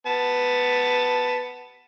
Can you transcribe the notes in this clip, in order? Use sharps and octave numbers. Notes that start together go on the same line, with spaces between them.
B3 A5